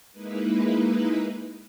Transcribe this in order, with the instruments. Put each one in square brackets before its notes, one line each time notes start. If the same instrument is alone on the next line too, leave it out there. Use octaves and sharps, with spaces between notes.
[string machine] G#3 A#3 D#4 E4 B4